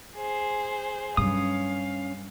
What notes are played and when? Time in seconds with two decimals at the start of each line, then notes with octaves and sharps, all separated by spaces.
0.15 G#4 C5
1.17 G2 F#3 C#4 F5 D#6